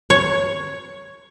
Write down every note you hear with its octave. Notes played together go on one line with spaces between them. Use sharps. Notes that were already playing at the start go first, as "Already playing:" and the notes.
C#5